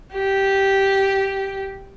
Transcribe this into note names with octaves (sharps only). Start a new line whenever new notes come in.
G4